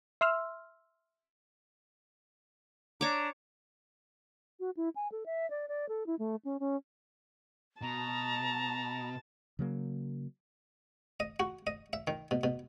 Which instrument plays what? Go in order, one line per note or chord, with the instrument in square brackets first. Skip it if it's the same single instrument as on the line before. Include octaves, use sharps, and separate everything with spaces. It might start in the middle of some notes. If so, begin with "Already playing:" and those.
[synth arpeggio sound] E5 C6 E6 F6
[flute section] D4 A#5 [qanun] C#5 D6
[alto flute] F#4
E4
G#5
A4
E5
D5
D5
A4
E4
A3
C#4
C#4
[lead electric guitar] B2 [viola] A5 [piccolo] A#5
[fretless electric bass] C#3 F#3 A#3
[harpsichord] D#5
F#4
D#5
E5
D#3
B2
B2